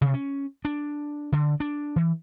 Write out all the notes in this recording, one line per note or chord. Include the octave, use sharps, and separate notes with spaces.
C3
C#4
D4
D3
D4
E3